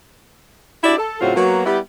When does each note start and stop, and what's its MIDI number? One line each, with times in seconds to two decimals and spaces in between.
0.84 0.96 62
0.84 0.96 64
0.84 0.96 66
0.84 0.96 67
0.84 0.96 74
0.98 1.19 69
1.20 1.33 45
1.20 1.33 49
1.20 1.33 54
1.20 1.33 60
1.20 1.33 65
1.20 1.33 66
1.35 1.65 54
1.35 1.65 58
1.35 1.65 59
1.35 1.65 66
1.65 1.79 55
1.65 1.79 59
1.65 1.79 64
1.65 1.79 67